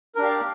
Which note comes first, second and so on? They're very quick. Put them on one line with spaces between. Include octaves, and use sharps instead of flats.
A#4 D4 G4 F5 D5